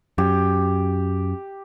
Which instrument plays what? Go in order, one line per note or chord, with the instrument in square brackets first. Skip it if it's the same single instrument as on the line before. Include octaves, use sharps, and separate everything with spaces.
[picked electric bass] F#2 [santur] G4